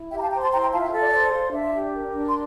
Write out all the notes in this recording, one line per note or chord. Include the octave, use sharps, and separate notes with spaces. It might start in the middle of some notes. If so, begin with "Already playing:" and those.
Already playing: E4
G4 E5 G5
A#5
F5 A5
C5 G5 A#5
A5 C6
E4 G5 A#5
G5 A#5
F4 F5 A5
E5 G5
A4 E5
D5
C5 D5
F4
D4 E5
G4
A#4
D4
C6